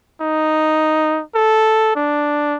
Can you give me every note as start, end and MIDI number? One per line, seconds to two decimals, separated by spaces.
0.21 1.22 63
1.35 1.93 69
1.96 2.57 62